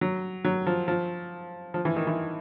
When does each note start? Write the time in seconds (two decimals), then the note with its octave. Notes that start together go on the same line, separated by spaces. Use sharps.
0.01 F#3
0.44 F#3
0.67 F3
0.88 F3
1.74 F3
1.85 E3
1.96 D#3
2.07 E3